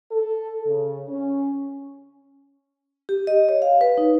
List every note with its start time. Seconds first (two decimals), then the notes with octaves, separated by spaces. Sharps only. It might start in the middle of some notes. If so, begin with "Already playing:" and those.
0.12 A4
0.67 C#3
1.09 C#4
3.09 G4
3.27 D#5
3.49 C#5
3.62 F5
3.81 B4
3.98 D#4